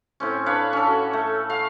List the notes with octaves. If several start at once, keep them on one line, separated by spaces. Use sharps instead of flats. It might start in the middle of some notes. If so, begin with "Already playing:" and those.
A2 C4 C#4
D4 B4 C#5 F5
C#4 A4
F#4
A3
F5